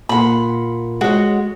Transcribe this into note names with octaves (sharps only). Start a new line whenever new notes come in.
A#2 F#5 B5 C6
G#3 F#4 C#5